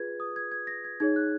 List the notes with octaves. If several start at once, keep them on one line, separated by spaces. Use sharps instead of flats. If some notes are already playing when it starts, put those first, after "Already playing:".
Already playing: F4 G#4 B4 G#6
D#6
G#6
G#6
A#6
G#6
D#4 G#4 C#5 G#6
F#6